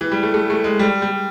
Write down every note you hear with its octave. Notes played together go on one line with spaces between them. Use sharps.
E3
G3
A3
A3
A3
G#3
G3
G3